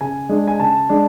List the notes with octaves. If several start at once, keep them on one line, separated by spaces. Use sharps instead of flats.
C#3 G#5
G#3 D4
G#5
C#3 A5
G#3 D4